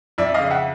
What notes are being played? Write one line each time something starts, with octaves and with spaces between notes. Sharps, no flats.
F2 D5 E5
D#5 F5
C#3
E5 F#5